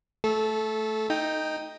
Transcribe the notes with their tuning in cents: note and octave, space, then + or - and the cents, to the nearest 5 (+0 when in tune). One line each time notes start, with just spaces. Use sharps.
A3 +0 A4 -20
D#4 +0 G5 +5